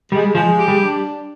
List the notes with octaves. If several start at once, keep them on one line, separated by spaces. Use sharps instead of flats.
G3 G#3
F3 G#3
G4
G3
D4